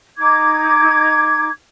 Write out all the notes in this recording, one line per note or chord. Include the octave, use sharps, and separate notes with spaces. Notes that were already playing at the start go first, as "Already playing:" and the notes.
D#4 D6 G#6